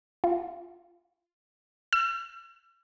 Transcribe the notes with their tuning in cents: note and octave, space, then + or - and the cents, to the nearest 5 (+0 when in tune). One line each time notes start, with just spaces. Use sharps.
F4 +0
E6 +45